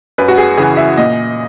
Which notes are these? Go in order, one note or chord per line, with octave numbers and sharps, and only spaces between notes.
F#2 B4
F#4
G#4
C#3 E3 G#4
E5
A#2 D#5